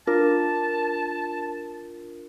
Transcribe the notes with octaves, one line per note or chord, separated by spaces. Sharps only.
D4 F4 A#4 A5